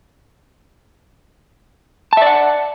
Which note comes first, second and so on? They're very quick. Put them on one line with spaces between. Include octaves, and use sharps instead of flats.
A5 E5 D5 F#5